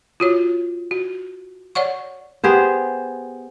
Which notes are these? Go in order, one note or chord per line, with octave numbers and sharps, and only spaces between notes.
F4 F#4 C#5
F#4
C#5 D5 F#5 C#6
B3 G4 G#4 C5